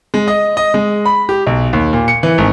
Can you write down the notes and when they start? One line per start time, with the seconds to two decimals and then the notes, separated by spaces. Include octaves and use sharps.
0.14 G#3
0.28 D#5
0.57 D#5
0.74 G#3
1.05 B5
1.29 G4
1.47 B1
1.73 D#2
1.93 A#2
2.08 C#7
2.23 E3
2.38 G#1